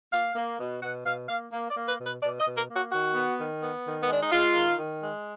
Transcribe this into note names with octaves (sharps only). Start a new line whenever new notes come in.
A#3 F5
A#3
B2
B2 F#5
B2 F5
A#3 F5
A#3
D5
A#3
B4
B2
B4
B2 D5
D#5
B2
A#4
A#3
F#4
D#3 F#4
B3
D#3
B3
D#3
B3
G#3 D4
D#4
G#3 F4
D#3
D#3
G#3